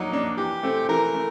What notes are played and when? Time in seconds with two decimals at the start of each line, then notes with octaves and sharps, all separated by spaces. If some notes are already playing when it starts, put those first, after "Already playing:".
Already playing: F#3 A#3 D4 D#4
0.12 A#3 D4
0.37 E3 G4
0.63 A3 C4
0.89 E3 A#4
1.14 A3